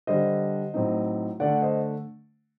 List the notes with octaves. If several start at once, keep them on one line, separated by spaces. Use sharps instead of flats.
D3 G3 D4 C5 D#5
A2 F#3 C4 D#4
D3 A3 D4 D5 F#5
C5 D#5